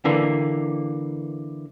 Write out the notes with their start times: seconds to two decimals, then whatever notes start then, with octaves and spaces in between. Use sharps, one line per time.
0.05 D3 E3 A#3